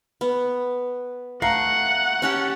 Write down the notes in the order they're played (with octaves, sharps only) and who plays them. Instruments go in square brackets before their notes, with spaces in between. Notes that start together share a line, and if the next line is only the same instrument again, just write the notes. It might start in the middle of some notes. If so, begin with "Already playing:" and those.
[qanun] B3
[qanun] A3 [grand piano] F5 A#5 C7 [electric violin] F#5
[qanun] C#4 G4 A5